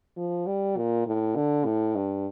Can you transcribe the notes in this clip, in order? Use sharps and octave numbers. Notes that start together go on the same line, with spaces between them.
F3
G3
A#2
A2
D3
A2
G2